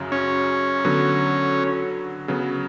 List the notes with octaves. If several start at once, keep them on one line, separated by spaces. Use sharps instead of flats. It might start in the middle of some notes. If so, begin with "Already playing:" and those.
Already playing: F#2 C#3 F#3
C#4
D3 F#3 B3
C#3 F#3 B3